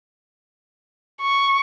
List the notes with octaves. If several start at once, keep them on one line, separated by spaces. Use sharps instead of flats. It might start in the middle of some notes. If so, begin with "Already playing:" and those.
C#6